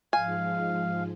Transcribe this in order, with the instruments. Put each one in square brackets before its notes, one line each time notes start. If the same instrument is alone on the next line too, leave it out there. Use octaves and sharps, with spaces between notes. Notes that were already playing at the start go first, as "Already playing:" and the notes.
[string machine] G#2 F3 G#3 [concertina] F5 [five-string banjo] G#5